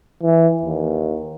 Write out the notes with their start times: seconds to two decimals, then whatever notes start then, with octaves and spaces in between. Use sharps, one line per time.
0.23 E3
0.63 D#2